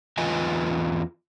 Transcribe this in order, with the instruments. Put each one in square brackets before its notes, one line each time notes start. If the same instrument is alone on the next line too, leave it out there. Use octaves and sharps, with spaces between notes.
[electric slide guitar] E2 F4 B4 D#5 G#5